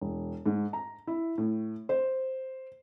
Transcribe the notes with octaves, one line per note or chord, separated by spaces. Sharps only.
E1
G#2
A#5
E4
A2
C5